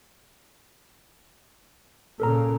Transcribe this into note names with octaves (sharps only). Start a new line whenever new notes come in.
A#2 C#3 A4 A#4 A#5